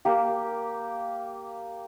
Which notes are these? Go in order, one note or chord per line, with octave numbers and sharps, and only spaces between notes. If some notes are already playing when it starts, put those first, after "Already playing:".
A#3 G4